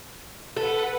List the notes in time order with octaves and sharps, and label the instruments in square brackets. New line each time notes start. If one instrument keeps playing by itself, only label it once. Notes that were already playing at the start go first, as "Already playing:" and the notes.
[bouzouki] A4 [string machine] B4 F#5